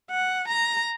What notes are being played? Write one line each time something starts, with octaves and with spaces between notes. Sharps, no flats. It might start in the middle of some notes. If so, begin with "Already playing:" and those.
F#5
A#5